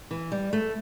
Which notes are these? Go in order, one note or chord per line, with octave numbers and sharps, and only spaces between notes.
E3
G3
A3